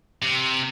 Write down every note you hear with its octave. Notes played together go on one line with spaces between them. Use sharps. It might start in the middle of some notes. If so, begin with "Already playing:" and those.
C3